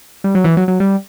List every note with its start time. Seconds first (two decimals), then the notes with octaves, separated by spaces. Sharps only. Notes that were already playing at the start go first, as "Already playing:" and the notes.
0.24 G3
0.35 F#3
0.44 E3
0.57 F#3
0.68 F#3
0.80 G3